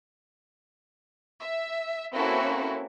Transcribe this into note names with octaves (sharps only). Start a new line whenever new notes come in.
E5
A#3 C4 C#4 E4 F#4 A4